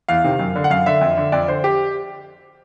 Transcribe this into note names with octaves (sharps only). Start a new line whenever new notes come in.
E2 F5
C3 D#3
F#2
D3
F#5
F#2 F5
D3 E5
F2
D3
F2 D5
D3 C5
G4